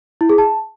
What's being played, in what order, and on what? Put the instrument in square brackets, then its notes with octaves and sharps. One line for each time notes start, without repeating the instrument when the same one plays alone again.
[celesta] E4
G#4
A5